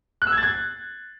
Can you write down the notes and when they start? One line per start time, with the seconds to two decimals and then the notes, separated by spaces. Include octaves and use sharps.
0.22 F#6
0.27 E6
0.32 G#6
0.37 A6
0.43 G#6